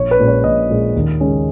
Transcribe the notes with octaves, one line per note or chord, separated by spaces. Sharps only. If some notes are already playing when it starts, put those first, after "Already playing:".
Already playing: A#1 C#5
B4
A#2 G#3 C#4
C#5
A#1 D#5
A#2 G#3 C#4
D#2
C#3 G#3 C#4